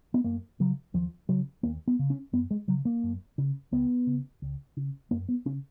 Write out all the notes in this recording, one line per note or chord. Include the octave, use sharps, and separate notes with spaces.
B3
F#2 A#3
C#3 F#3
D#2 F3
C#3 F#3
D#2 A#3
B3
C#3
C#4
F#2 B3
G#3
C#3 F#3
A#3
F#2
C#3
C#2 B3
C#3
C#2
C#3
F#2 A#3
B3
C#3 C#4